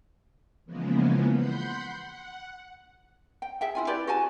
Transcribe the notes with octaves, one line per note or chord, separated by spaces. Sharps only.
C#3 E3 F3 G#3 A#3 B3
F#5 B5 C6 G6
F#5
G5
G#4 E5 G5
E4 F4 G#5
E4 G4 B4 D5
F#4 G#4 G#5 A5